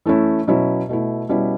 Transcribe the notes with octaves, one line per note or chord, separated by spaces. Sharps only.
E3 A3 C#4 E4
B2 F#3 C#4 E4
B2 A3 E4
B2 G3 C#4 E4